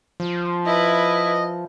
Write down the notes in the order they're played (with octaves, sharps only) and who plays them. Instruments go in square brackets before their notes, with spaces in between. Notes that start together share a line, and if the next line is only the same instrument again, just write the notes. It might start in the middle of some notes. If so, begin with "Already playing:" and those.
[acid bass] F3
[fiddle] E4 B4 [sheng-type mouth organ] D#5